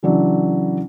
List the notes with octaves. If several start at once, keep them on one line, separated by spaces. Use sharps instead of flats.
C#3 E3 F#3 D4 E4